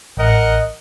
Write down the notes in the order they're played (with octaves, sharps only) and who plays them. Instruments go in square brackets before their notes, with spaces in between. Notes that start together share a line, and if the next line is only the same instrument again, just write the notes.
[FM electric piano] A1 [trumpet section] A#4 D#5 F#5